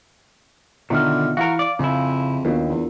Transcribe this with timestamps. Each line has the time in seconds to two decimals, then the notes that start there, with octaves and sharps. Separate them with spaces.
0.90 B2 D3 D#3 F4 E5 F6
1.37 E3 F#4 A#4 F5
1.59 D5
1.79 F2 C#3 E4
2.45 D#2 B2 D4 F4 A#4
2.69 E2